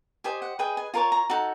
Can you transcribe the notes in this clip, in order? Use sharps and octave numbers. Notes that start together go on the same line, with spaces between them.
G4 C5 D#5 G#5
F#5
G#4 B4 D#5 G5
G#5
F4 A#4 C#5 A5
A#5
D#4 F#4 A4 A5